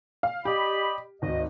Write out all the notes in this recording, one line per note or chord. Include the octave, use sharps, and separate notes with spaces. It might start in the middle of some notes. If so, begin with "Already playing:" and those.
F5
G4 D5 D#5 B5
G#1 D2 D#5